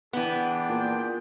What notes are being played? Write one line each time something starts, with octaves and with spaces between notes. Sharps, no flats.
E3 B3 D4 G#4 G5
A#2